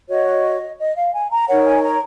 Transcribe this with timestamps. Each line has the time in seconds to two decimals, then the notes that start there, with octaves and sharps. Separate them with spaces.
0.08 F#4 C#5 D#5
0.78 D#5
0.96 F5
1.13 G#5
1.30 A#5
1.48 D#4 A#4 C#5 F#5
1.65 G#5
1.83 A#5